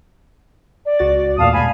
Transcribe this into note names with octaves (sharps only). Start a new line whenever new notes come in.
D5
C#2 F#4 A6
E2 A#2 A3 F5 A5 D#6
G#2 B2 G#5 B5